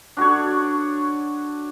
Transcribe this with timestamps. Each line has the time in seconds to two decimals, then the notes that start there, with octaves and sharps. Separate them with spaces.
0.17 D4 F#4 A4 C#5